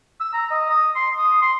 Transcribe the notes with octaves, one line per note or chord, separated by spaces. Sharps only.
E6
A#5
D#5
D#6
C6
D#6
C6